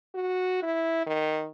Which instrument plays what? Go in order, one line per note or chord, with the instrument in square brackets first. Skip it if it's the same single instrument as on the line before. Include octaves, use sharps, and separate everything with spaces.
[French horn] F#4
E4
D#3